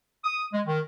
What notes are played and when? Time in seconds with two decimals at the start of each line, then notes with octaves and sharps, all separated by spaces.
0.24 D#6
0.53 G#3
0.66 D#3